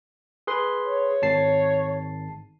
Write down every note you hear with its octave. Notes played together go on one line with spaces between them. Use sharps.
G#4 B4 C6
C#5
G#1 A5 C7